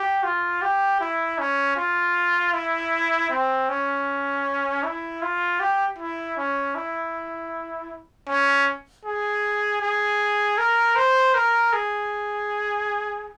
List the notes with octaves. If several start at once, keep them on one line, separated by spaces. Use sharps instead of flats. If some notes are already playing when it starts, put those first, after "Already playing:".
Already playing: G4
F4
G4
E4
C#4
F4
E4
C4
C#4
E4
F4
G4
E4
C#4
E4
C#4
G#4
G#4
A#4
C5
A#4
G#4